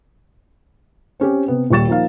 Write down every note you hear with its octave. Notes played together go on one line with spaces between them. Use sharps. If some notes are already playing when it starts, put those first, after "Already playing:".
C4 C#4 G4
C3 B3
D#1 A#2 G3 C#6 A6 E7
F3 A#3 D#4 F5